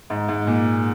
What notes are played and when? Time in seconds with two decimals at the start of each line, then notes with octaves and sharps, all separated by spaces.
0.10 G#2
0.29 G#2
0.47 A#2